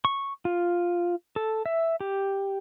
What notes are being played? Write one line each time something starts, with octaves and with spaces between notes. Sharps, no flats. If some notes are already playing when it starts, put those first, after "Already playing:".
C#6
F4
A4
E5
G4